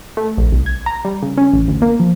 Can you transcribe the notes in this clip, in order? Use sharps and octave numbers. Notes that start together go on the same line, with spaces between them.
A3
A#1
C2
G#6
A#5
G3
C#3
C#4
A1
D2
A#3
F3